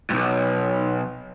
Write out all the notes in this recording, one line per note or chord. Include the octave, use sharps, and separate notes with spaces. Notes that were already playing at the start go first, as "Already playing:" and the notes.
B1 G2